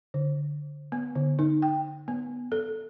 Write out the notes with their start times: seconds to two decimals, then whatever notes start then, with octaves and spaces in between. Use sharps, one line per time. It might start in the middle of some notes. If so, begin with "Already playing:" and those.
0.14 D3
0.92 B3
1.15 D3
1.39 D#4
1.62 G5
2.08 B3
2.52 A4